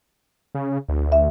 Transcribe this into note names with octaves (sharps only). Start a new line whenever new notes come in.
C#3
D2
E5